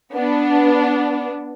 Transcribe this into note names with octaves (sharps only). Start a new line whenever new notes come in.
B3 D4